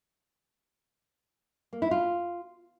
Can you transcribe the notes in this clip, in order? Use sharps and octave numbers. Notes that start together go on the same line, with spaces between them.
A#3
E4
F4